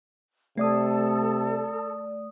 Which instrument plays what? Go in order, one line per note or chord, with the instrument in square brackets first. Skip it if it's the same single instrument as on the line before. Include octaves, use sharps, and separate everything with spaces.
[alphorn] C3 [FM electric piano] A3 D5 D#6 [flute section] A4